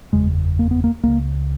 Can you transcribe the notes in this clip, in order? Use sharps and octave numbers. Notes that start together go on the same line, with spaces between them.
F#1 E2 C#3 G#3
A#3
B3
A#3
C#2 C#3 A#3